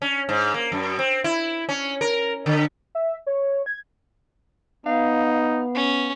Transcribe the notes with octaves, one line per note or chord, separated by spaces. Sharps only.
C#4
G#2
A#3
F#2
C4
E4
C#4
A#4
D3
E5
C#5
G#6
B3 D#4 F5
C#4